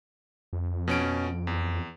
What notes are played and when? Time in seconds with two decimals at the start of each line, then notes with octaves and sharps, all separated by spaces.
0.53 F2
0.88 B2 C#4 D7
1.47 E2